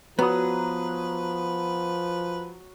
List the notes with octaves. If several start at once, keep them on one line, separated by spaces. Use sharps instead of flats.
F3 F#3 B3 B4 F#5 D#6